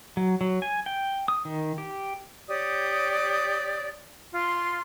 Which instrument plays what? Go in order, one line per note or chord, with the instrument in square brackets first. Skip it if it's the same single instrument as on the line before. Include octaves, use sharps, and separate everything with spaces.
[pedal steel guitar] F#3
F#3
G#5
G5
D#6
D#3
G4
[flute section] G4 C#5 D5 D#6
F4 C6